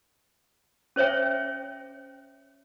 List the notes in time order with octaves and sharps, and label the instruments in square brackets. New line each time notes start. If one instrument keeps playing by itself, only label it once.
[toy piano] C#4 C5 C#5 E5 G5